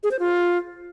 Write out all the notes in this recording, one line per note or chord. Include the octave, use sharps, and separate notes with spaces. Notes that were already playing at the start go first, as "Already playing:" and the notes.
G#4
C5
F4